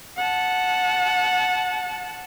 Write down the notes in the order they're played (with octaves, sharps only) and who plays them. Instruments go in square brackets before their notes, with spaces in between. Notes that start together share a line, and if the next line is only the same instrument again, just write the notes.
[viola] F#5 A5